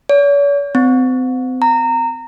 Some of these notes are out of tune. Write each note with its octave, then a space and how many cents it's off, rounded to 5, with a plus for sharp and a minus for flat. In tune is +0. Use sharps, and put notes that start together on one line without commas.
C#5 +45
C4 -35
A#5 -20